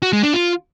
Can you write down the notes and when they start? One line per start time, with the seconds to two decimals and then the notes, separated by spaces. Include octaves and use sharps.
0.02 F#4
0.13 G#3
0.23 D4
0.33 F4